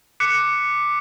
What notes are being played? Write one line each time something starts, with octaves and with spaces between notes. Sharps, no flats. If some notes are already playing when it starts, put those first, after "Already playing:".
D6 F#6 B6 C#7 E7